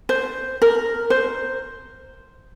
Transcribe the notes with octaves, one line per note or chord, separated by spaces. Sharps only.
C5
A#4
C5